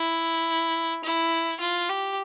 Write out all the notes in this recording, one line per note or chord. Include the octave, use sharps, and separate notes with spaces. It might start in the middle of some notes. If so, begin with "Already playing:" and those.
Already playing: E4
E4
F4
G4